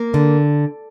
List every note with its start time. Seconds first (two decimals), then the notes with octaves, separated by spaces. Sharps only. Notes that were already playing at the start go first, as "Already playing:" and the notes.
Already playing: A#3
0.14 D3